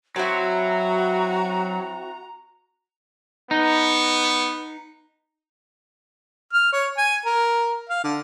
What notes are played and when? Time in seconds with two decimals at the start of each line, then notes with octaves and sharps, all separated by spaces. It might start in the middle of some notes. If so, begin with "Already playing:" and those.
0.16 F#3 C4 E4 F#4 A#5
3.51 B3 D#4
6.53 F6
6.73 C#5
6.97 G#5
7.26 A#4
7.89 F5
8.04 D3